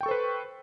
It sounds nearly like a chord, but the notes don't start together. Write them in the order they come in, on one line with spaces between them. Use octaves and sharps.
G5 C#6 A4 C5 B4